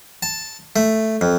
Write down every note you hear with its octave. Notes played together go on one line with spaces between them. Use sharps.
A5
A3
F2